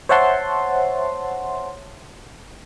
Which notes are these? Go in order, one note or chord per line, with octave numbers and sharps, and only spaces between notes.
C5 C#5 E5 F#5 A5 C6